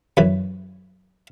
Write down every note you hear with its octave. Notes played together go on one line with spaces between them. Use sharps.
F#2 E3